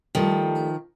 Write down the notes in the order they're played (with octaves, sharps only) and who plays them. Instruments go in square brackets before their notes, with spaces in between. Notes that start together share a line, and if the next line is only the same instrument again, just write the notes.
[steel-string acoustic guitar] D#3 F3 [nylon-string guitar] G3 A3